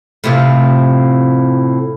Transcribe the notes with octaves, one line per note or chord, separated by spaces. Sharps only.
A2 C3 F3